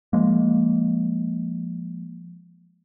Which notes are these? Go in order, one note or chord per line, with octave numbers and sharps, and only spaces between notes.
F3 G#3 A#3